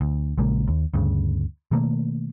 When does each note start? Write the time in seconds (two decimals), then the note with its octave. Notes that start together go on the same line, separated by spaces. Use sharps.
0.01 D2
0.38 A#1 C#3 G#3 A#3
0.68 D#2
0.94 D2 G2 C#3
1.71 B2 D#3 A3 A#3